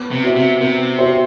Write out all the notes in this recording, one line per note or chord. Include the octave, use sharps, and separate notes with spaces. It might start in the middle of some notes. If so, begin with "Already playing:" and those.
Already playing: B3
C3
F#4 C5 E5
C3
C3 B3
F#4 C5 E5